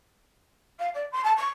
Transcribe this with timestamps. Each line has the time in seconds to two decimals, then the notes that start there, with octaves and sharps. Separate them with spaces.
0.79 F5
0.94 D5
1.12 C6
1.23 A5
1.36 C#6